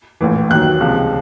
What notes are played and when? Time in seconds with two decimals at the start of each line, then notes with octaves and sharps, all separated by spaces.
0.21 A#1 A2 E3
0.50 D#2 D#3 F#3 F#6
0.80 C#2 C3 F3